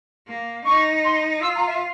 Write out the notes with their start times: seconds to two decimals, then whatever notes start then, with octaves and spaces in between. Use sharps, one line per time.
0.27 A#3
0.65 D#4 C#6
1.04 C6
1.42 F4 E6
1.55 A#5
1.67 E5